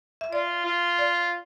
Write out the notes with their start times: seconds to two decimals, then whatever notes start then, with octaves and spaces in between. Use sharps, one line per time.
0.21 E5
0.32 F4 D5
0.65 F4
0.99 D5